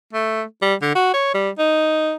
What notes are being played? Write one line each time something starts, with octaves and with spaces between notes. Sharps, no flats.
A3
G3
D3
F#4
C#5
G3
D#4